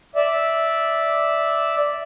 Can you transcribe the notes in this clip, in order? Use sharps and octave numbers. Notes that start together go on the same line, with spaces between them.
D5 E5